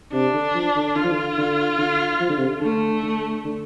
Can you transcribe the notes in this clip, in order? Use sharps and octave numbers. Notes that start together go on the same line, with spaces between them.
C3 D4
D3
F3
D3
D3 F4
F3
D3
D3
D3
F3
D3
C3
D3
D3 A3
D3
D3